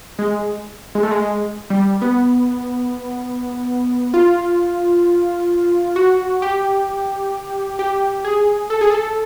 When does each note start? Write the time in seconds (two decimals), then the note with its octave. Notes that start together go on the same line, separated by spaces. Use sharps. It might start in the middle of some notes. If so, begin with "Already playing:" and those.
0.19 G#3
0.95 G#3
1.03 A3
1.11 G#3
1.70 G3
2.02 B3
4.14 F4
5.96 F#4
6.42 G4
7.79 G4
8.25 G#4
8.70 A4
8.81 G#4
8.90 A4